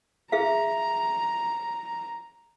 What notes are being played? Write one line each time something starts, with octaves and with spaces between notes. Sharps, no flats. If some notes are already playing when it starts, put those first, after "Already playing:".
G#4 E5 F5 A#5